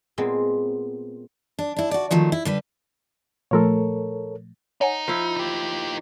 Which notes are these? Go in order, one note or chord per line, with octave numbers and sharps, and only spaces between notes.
A#2 G#3 B3 C4
D4
D4 E4
F#4 D5
D#3 F3 F#3 A3
E4
D3 G3 B4
A#2 F3 A3 A4 A#4 C#5
D#4 C#5 F#5 G#5
F3 E4
D#4 G4